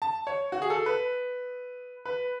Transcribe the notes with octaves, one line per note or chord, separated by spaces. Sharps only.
A5
C#5
F#4
G#4
A4
B4
B4